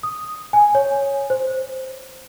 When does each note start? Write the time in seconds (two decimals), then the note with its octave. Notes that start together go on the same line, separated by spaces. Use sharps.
0.03 D#6
0.53 G#5
0.75 C#5
1.30 C5